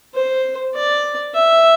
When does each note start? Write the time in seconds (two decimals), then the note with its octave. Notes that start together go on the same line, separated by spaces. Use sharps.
0.14 C5
0.74 D5
1.34 E5